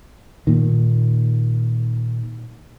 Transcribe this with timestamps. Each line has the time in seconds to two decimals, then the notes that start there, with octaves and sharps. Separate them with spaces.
0.47 A#2 D#3